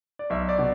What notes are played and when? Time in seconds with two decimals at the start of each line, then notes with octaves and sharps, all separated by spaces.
0.19 D5
0.30 B1 E5
0.49 D5
0.58 B2